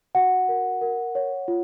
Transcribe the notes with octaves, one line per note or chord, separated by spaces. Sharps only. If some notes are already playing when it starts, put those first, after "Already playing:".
F#4 F#5
A#4
A#4
C#5
F4